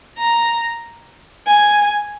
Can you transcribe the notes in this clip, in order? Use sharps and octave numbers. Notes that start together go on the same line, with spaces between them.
A#5
G#5